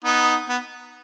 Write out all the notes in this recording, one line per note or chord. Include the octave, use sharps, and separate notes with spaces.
B3 D#4
B3